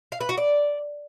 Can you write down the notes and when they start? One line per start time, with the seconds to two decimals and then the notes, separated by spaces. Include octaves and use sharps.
0.12 F5
0.20 B4
0.29 F#4
0.37 D5